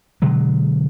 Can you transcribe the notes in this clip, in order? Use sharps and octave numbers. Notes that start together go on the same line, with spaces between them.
B2 D3 F#3 G#3